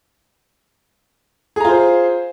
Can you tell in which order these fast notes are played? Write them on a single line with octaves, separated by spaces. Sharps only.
G#4 A#5 F4 C5